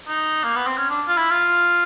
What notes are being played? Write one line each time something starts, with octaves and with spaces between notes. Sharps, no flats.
D#4
A#3
B3
C4
C#4
D4
F4
E4
F4